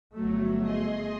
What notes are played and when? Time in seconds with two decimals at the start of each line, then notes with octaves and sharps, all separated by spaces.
0.15 G1 F#3 A3
0.60 G#4 D#5 C6